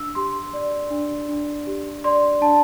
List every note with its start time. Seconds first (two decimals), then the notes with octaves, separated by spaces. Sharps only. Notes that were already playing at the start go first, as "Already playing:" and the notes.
Already playing: D4 E6
0.15 G4 C6
0.53 D5
0.90 D4
1.28 D4
1.67 G4
2.04 D5 C6
2.41 D4 A5